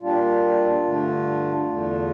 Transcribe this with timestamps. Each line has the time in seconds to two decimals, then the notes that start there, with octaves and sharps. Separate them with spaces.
0.01 A#2 G3 D4 F4
0.84 G2 D3 A3 D4
1.68 E2 D3 A3 D4